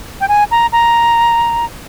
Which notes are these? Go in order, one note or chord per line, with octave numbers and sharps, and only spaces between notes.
G5
G#5
A#5
A#5